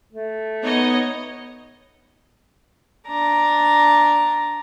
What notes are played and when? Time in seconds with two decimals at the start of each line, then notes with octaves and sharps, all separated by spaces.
0.13 A3
0.63 B3 D#4 C#5 D#5
3.08 D4 A#5